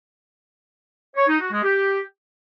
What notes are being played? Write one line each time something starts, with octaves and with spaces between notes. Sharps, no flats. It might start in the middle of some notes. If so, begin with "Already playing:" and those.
C#5
D#4
F#4
G#3
G4